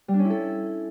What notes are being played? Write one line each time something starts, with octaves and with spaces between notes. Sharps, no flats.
G3
D4
C#4
E4
A4